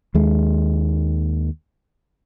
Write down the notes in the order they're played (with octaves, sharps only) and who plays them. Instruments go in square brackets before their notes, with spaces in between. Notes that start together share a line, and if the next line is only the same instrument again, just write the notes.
[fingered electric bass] D#2 G#3